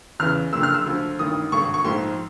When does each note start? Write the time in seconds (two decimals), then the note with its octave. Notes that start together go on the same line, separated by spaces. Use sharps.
0.19 E2 C#3 E3 F6
0.52 F#1 F2 D3 E6
0.63 F6
0.74 E6
0.85 D2 D3 F3
1.19 A1 G2 D#3 D#6
1.52 G#1 G2 D3 C#6
1.74 C#6
1.84 A#1 G#2 F3 C6